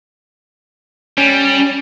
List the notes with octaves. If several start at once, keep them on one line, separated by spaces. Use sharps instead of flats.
G3 C#4